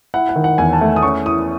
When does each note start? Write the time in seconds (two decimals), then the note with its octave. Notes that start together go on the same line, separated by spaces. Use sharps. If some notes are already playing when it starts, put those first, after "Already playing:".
0.14 E4 F#5
0.29 F#5
0.36 D#3
0.44 F#5
0.58 E2 G#5
0.73 A5
0.81 A3
0.96 D#6
1.03 C#4 C#6
1.25 E3 D#6